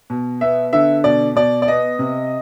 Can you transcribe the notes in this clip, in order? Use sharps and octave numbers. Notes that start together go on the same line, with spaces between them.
B2
B3 E5
D3 E5
B2 D5
B2 D5
D5
B3 D#5
C3